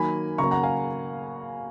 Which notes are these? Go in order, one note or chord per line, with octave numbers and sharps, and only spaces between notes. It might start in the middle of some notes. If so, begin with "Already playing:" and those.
Already playing: D#3 F#3 A#3 G#5 B5
C#3 F#3 A#3 A#5 C#6
F#5 A#5
F5 G#5